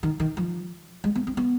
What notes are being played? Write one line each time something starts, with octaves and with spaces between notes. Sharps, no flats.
D#3
D#3
F3
G#3
B3
C4
B3